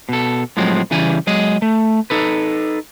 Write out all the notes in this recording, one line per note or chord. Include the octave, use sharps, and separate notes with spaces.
B2 A4
A2 F3 F#3 G#3 C4
C#3 E3 G3 G#5
F#3 G#3 D#5
A3
D#4 A4 B4